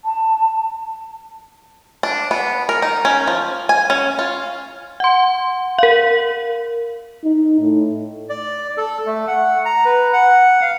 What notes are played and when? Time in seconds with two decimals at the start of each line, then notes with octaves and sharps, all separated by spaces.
0.05 A5
2.03 D4
2.31 B3
2.69 A#4
2.82 D#4
3.05 C#4
3.28 F3
3.69 G#5
3.90 C#4
4.19 F4
5.00 F#5 C6
5.79 A#4 F5
7.24 D#4
7.61 A2
8.29 D5
8.77 A4
9.06 A3
9.27 F#5
9.65 A#5
9.85 B4
10.13 F#5
10.61 F5